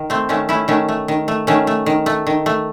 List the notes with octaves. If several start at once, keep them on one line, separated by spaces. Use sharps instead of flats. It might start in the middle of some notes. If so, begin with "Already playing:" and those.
Already playing: D#3
A3 C4
D#3 A3 C#4
A3 C#4 E4
D#3 A3 C#4
A3
D#3
A3
D#3 A3 C#4
A3
D#3
A3
D#3
A3